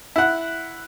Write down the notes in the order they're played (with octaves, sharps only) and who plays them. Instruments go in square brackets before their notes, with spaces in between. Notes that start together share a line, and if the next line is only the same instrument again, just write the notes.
[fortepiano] E4 F#5